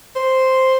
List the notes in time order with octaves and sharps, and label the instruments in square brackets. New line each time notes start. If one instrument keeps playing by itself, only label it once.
[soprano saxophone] C5